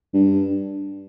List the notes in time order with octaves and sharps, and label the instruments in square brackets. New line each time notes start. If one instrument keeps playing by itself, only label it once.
[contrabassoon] G2